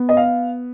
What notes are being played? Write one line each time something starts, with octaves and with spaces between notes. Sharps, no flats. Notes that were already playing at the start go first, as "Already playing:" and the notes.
Already playing: B3
D#5
F5